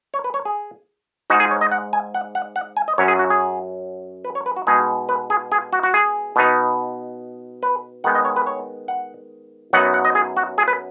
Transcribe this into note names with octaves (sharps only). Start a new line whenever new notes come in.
C#5
B4
C#5
G#4
G#2 G#3 D#4 F#4
G#4
C#5
D#5
F#5
G#5
F#5
F#5
F#5
G#5
D#5
F#2 F#3 C#4 C#5
G#4
F#4
G#4
B4
C#5
B4
F#4
B2 G#3 D#4 G#4
B4
G#4
G#4
F#4
F#4
G#4
B2 B3 D#4
B4
D#3 G#3 B3 D#4 F#5
D#5
C#5
B4
C#5
F#5
F#2 F#3 B3 D#4 F#5
F#5
D#5
G#4
F#4
G#4
B4